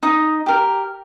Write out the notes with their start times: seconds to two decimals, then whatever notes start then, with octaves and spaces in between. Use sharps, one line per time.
0.03 D#4 D#6
0.46 G4 A#4